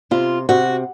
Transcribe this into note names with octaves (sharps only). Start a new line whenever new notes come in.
C3 F4
C3 F#4